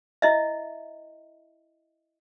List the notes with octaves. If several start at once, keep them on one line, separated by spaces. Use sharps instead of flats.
E4 D#5 E5